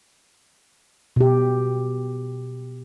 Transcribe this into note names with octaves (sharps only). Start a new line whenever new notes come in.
B2 G4